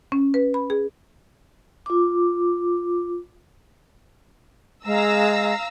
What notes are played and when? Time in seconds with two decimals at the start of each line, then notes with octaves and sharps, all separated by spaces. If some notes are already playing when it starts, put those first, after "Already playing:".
0.12 C#4
0.34 B4
0.54 B5
0.70 G#4
1.86 F4 D6
4.85 G#3 F5 A#5 E6